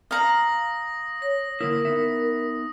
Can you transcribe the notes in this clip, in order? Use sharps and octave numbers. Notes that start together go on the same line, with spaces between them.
F5 A#5 D#6 A#6 F#7
C#5 A#6
D3 A#3 E4 A#4 D#6
B3 D#4 E5